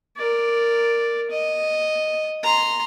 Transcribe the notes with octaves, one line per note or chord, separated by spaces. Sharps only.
A#4 D5
D#5
A#5 C6